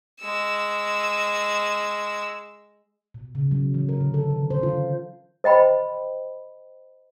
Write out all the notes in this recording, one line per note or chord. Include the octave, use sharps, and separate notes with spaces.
G#3 E6
B2
C#3
F#3
E3
A#4
D3
A4
D#3
C5
F4
C5 D#5 G5 B5 C6